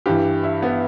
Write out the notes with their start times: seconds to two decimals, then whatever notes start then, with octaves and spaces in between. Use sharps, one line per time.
0.06 G2 E3 G4
0.43 E4
0.62 B3